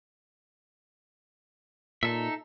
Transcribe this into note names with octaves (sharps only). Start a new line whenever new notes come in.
A#2 D#4 A4 E5